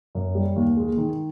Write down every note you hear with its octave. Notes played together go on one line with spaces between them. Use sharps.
F#2
G3
D#2
G#3
D#3